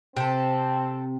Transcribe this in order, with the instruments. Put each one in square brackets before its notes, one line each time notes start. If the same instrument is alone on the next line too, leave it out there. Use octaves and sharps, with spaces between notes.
[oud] C3 [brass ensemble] C4 [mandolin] G4 A4